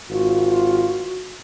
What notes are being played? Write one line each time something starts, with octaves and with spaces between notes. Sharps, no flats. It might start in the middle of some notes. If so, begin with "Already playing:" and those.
G#1 F4 F#4